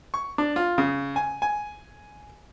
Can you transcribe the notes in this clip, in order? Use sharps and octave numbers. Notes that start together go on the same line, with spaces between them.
C#6
D4
F4
C#3
G#5
G#5